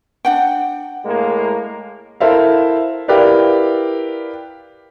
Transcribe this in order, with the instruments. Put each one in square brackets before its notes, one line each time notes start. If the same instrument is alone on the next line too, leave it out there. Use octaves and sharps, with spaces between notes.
[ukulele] D4 F#5 G5
[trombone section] A2 G#3 A#3
[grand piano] E4 A4 A#4 C5 E5 F5
E4 G4 A#4 B4 D5 F5